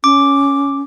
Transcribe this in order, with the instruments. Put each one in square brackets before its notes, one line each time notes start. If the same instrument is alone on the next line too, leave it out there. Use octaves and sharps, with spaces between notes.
[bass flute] C#4 [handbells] D6